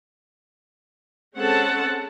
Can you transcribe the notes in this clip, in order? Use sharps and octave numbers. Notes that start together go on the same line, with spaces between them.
G#3 C4 C#4 A4 F#5 A5